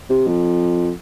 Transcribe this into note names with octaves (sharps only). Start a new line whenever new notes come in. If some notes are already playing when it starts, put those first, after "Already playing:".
C3
F2